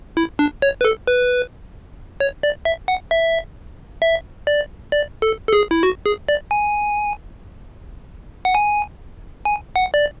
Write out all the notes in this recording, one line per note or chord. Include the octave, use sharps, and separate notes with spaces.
E4
D4
C#5
B4
A4
B4
C#5
D5
E5
F#5
E5
E5
D5
D5
A4
A4
G#4
E4
F#4
G#4
D5
G#5
F#5
G#5
G#5
F#5
D5